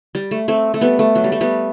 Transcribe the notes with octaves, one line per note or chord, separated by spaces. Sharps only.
G3
A3
A3 C4
A3
G3 B3
A3
F#3
G3
A3
G3 B3